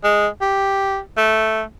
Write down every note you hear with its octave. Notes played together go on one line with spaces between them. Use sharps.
G#3
G4
A3